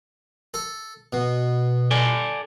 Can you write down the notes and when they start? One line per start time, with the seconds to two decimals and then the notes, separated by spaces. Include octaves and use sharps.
0.54 A4
1.13 B2
1.91 A4 D5 G#5